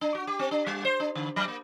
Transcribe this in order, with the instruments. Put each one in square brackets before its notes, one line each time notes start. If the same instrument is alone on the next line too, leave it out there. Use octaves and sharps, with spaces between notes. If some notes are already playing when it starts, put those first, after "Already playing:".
[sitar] D4
F#4
G4
C4
D4
G3
C5
D4
D3
F#3
A#3